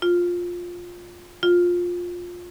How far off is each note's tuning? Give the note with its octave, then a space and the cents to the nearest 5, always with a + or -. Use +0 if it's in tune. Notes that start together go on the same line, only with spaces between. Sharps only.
F4 +10
F4 +15